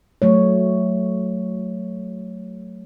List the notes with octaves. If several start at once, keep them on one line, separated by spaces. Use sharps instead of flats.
F#3 A3 C#5